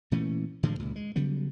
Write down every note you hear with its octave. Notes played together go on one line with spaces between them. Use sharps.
A#2 E3 A3 C#4
A2 D3 F3 G#3
C#2 A#2
G#3
C#3 F#3 G3 B3